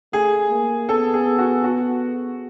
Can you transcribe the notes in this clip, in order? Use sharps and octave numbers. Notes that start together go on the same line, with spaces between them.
A3 G#4
A#3
B3 A4
G#4
F#4
F#4